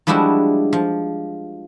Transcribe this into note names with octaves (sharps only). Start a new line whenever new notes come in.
F3 G3 G#3 D4 E4 F#4
F3